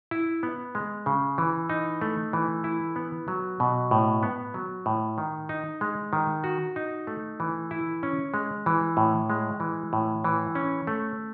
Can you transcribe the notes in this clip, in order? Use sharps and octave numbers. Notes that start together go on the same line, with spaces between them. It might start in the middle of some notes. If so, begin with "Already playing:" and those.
E4
B3
G#3
C#3
E3
D#4
A3
E3
E4
B3
F#3
B2
A2
B3
F#3
A2
D#3
D#4
G#3
D#3
F#4
D#4
A3
E3
E4
C#4
G#3
E3
A2
G#3
E3
A2
E3
C#4
A3